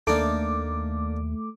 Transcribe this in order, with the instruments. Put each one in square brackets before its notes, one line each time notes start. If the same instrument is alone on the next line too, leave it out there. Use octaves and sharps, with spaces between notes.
[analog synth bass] D#2 [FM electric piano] A3 D6 [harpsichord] A#3 D4 D#4